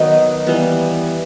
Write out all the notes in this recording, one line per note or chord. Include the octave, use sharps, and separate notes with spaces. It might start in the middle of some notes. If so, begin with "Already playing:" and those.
Already playing: D#3 F#3 B3 D#4
E3 G3 B3